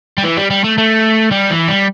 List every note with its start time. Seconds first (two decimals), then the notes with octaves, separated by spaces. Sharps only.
0.18 G3
0.23 E3
0.37 G3
0.50 G3
0.64 A3
0.78 A3
1.32 G3
1.51 E3
1.68 G3